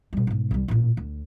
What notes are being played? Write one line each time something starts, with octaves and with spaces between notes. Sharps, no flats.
B2 G3
G#2 B2
C2 G3
A1 A#2
D2